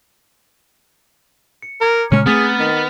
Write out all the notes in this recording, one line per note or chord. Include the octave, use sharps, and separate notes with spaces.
C#7
A#4 A#5 D6 G#6
A#2 C#3 G#3 C#4 F6
A3 B3 C4 G#4 F6 A6 B6
D#3 B6